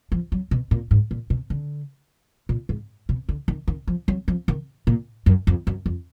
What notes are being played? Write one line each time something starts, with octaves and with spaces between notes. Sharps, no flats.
F3
F#3
B2
A#2
G#2
A#2
B2
D3
A#2
G#2
B2
D3
D#3
D#3
F3
F#3
F3
D#3
A#2
F#2
F2
F#2
F2